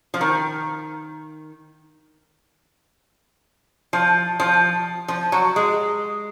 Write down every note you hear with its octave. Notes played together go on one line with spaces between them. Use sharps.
F3
D#3
F3
F3
F3
F#3
G#3